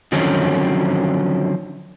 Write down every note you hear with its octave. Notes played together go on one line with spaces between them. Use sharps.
D3 D#3 F3 F#3 C4 C#4